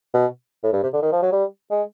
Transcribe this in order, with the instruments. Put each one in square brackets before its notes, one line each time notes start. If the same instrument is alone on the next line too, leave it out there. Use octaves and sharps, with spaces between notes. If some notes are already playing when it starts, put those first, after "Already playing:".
[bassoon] B2
A2
G2
C3
D3
D#3
F3
F#3
G3
G#3